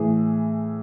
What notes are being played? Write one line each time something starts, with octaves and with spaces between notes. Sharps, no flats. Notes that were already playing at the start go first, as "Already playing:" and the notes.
Already playing: A2 E3 G#4